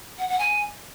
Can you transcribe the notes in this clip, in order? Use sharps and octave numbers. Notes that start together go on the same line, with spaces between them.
F#5
F#5
G#5